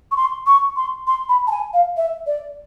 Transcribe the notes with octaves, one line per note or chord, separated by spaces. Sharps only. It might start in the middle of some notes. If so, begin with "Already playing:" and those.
C#6
C6
C#6
C6
C6
B5
A5
G#5
F5
E5
D5